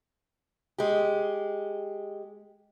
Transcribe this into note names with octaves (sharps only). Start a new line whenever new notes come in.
G#3 G4